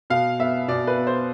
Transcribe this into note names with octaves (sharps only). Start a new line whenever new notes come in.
B2 F5
B3 E5
B2 D5
B4
B3
C5